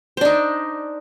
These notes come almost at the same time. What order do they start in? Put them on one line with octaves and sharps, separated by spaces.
C5 D4 D#4